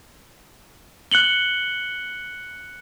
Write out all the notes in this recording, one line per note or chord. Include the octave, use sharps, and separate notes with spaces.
F#6 C#7 F#7 G7